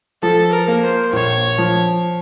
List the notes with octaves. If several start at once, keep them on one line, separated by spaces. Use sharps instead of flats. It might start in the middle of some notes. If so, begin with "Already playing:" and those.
F3 A4
A#4
A#3
C5
A#1 C#5
F3